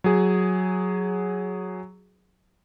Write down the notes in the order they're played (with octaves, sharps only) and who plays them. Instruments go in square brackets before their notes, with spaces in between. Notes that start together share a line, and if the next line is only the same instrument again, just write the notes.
[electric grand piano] F#3 G#4